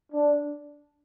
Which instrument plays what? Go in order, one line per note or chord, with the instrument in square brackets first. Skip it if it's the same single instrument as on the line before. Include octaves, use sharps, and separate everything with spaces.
[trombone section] D4